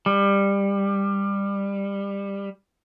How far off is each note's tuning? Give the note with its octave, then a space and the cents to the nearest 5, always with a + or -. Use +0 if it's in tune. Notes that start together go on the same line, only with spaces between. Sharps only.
G3 +20